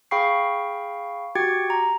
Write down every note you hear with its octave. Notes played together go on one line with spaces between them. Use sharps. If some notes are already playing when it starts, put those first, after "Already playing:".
G#4 F5 G5 B5 C#6 C7
F#4 G4 G5 G#6 A6 C#7
A#5